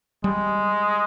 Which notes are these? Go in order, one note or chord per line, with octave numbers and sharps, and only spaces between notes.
G3 G#3